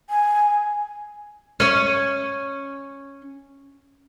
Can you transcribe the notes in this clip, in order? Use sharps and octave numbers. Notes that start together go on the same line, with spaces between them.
G#5
C#4 C#5